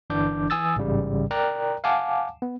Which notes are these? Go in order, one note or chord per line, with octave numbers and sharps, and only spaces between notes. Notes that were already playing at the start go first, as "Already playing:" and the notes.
G1 E3 D4 D6 G6
E3 G#5 D#6 E6 A6
A1 G#2 C#3 G3
A#4 D5 G5 A#5 F#6
F5 F#5 G#5 A5 D6
B3